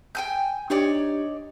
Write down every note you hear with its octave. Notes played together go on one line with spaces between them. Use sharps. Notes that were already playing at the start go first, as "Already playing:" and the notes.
G5 G#5 G6
D4 D#4 G4 C#5 D5